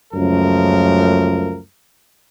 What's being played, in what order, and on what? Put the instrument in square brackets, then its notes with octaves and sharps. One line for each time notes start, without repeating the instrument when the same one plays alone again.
[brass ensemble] C#2 F#2 F3 A3 A#4